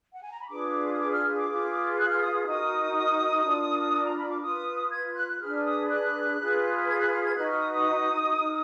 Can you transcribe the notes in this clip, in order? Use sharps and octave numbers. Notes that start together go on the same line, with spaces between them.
F#5
G#5
A#5
B5
D4 F4 G#4 B4 D6
D#6
D6
F6
D6
F4 G#4 B4
F#6
F6
D#6
D#4 F#4 A#4 D#6
D4 F4 A#4
A#5
B5
D6
F4 B4 D#6
G#6
F#6
F#6
D4 G#4 B4 F6
D#6
F#6
F4 G#4 B4
G#6
F#6
F6
G#6
D#4 F#4 B4 F#6
F6
D#6
D#6
D#4 A#4